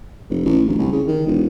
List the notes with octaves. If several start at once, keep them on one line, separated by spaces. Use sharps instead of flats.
F1
A1
D1
C2
C#3
D#3
E1